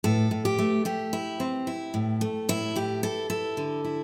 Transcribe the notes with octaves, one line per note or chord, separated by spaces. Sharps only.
A2 A4
A2
G4
A3
A3 G4
E4
C4
E4
A2
A3
A2 E4
A2 G4
E4 A4
E4 A4
D3
E4